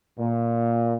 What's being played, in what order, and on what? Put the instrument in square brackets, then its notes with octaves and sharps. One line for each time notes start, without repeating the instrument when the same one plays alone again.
[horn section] A#2